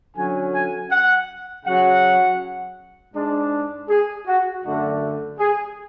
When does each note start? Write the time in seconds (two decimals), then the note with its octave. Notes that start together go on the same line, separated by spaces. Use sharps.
0.16 D3 F#3 C#4 G#5
0.53 G#5
0.91 F#5
1.65 C#3 F#3 C#4 F#5
3.15 G#2 G#3 D4
3.89 G#4
4.26 F#4
4.64 F#2 D3 A3 D4 F#4
5.39 G#4